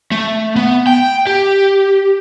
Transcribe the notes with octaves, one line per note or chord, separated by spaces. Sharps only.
A3
B3
G5
G4